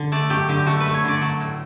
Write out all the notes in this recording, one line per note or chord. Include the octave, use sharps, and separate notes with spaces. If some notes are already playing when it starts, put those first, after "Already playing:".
Already playing: D3
A3 D5
F#3 G4
D3 G4
A3 F#4
B4
A3
C#5
D3 D5
F#3
A2